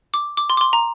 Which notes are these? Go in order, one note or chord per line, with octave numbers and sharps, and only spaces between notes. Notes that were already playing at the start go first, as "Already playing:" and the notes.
D6
D6
C6
D6
C6
A#5